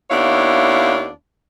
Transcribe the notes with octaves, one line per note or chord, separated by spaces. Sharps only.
D#2 B3 D4 E4 C#5 F5